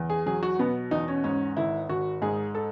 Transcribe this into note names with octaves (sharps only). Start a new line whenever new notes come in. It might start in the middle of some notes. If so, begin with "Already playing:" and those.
Already playing: E2
G#4
F#3 G#4
F#4
B2 B3
E2 D#4
C#4
G#2 C#4
G#1 E4
G#1 F#4
G#2 G#4
A4